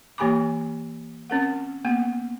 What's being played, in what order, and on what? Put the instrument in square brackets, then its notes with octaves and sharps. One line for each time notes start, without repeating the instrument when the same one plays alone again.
[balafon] E3 A#3 G4 G#5 B5 D6
C4 C#4 A#4 F#5
A#3 B3 F#5